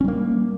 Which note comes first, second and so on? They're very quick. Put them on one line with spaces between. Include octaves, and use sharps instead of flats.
C#4 G3 A#3